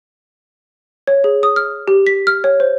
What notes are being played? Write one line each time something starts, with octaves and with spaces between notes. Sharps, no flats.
C#5
G#4
D#6
F6
G4
B6
F6
C#5
C5